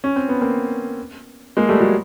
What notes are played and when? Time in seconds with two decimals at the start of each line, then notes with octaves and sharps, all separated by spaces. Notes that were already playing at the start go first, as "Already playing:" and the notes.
0.04 C#4
0.16 C4
0.29 B3
0.41 A#3 C4
1.57 G#3 A#3
1.69 G3 A3
1.80 F#3 G#3